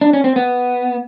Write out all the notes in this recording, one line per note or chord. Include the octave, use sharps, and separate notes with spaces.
D4
C#4
C4
B3